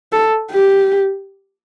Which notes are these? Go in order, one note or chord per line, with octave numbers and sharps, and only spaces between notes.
A4
G4